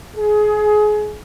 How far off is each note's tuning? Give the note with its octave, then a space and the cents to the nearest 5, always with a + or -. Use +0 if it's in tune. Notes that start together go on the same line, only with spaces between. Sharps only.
G#4 +25